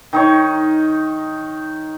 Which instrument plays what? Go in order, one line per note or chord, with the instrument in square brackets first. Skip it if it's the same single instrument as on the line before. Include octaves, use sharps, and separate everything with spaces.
[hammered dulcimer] D#3 D#4 C#5